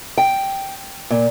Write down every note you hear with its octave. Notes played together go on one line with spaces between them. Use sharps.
G5
A#2